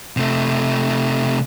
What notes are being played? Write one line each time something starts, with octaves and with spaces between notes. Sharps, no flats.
C3 A3